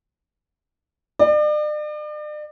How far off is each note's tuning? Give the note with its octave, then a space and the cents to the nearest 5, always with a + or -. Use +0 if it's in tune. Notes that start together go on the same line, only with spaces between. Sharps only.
D5 +40